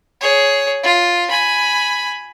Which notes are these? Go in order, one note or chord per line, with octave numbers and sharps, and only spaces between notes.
G#4 C#5
F4
G#5 B5